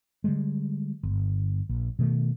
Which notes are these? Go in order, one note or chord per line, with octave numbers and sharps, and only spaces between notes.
D3 G3 G#3
G1
A#1
B2 D#3 A3